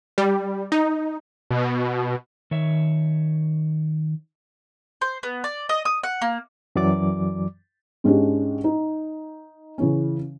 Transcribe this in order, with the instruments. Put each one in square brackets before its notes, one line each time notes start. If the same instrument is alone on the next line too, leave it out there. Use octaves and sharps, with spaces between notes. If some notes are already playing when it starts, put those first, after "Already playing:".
[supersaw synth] G3
D#4
[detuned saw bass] B2
[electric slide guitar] D#3 C#5 E5
[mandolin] C5
B3
D5
D#5
D#6
F#5
A#3
[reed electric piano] F#2 E3 F#3 D5 D6
[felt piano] G#2 G#3 C#4 D4 G4
D#4
C#3 E3 C#4